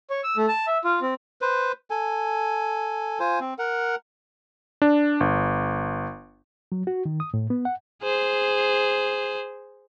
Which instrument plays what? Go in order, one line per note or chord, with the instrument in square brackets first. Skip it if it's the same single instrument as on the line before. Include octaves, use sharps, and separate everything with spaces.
[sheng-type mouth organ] C#5
E6
A3
A5
E5
F4
C4
[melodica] B4 C5
A4 G#5
F4 C5 G#5
C4
A#4 F#5
[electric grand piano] D4
G1
[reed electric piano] F#3
F#4
D#3
D#6
A2
B3
F#5
[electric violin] G#4 C5